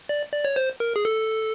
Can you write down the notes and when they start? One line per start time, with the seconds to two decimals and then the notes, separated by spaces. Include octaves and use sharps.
0.09 D5
0.33 D5
0.45 C#5
0.56 C5
0.80 A#4
0.96 G#4
1.05 A4